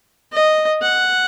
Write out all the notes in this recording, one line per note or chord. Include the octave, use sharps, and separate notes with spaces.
D#5
F#5